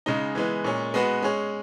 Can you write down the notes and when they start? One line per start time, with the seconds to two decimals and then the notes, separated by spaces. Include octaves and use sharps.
0.06 C#3 G#3 D#4
0.35 E3 G#3 B3
0.64 A#2 G#3 C#4
0.94 G#3 B3 F#4 B4
1.22 G#3 C#4 G#4